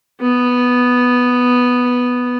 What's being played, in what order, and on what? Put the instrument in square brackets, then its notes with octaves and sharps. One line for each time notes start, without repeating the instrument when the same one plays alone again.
[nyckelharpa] B3